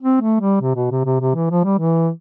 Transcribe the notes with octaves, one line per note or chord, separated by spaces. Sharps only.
C4
A3
G3
C3
B2
C3
C3
C3
E3
F3
G3
E3